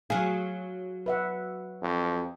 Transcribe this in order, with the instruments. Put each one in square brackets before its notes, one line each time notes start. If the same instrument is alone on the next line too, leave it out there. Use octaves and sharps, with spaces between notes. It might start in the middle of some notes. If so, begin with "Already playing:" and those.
[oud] F#3 G#4 [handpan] F5
[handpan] B4 E5 F#5
[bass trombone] F2